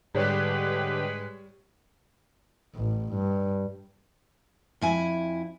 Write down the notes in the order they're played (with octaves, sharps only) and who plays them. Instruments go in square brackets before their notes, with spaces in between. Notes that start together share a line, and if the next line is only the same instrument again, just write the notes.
[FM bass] G#2 [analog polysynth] D3 G4 [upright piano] G3 C#5 [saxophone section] G#3 B4
[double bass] A1
G2
[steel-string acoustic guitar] F2 E4 G#5